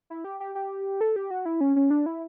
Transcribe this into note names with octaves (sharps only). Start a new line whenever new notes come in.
E4
G4
G4
G4
A4
G4
F#4
E4
C#4
C#4
D4
E4